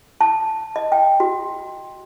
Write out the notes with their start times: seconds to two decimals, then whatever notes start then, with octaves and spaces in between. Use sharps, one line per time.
0.21 A5
0.76 D#5
0.92 G5
1.20 F#4